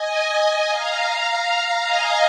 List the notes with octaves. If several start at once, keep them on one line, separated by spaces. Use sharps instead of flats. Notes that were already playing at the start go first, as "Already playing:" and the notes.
Already playing: D#5 G#5
F5 A#5
D#5 G#5